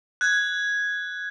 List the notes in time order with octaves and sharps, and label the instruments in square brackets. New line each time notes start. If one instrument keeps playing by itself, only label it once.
[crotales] F#6 G#6